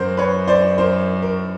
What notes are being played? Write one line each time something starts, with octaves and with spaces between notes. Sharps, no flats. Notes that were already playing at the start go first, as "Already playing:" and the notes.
Already playing: F#2 A#4 C5
B4 C#5
C5 D5
A#4 C5
A#4